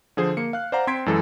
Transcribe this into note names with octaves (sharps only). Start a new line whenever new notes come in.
D3 F3 G#4 C5
A#3 C#7
F5 F#6
C5 D5 F5 F#5 A#5
C4 C6 G#6 B6 D7
F#2 E3 G#3 A4